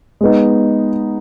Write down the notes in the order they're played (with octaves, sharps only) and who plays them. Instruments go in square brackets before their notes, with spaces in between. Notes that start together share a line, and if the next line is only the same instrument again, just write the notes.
[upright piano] G#3 B3 D#4